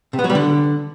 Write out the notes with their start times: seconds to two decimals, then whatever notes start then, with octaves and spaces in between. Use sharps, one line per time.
0.13 C3
0.19 B3
0.24 F#3
0.30 G3
0.35 D3